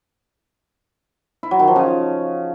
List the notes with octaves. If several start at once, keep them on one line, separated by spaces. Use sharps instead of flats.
E4
F#3
D#3
F3
C#3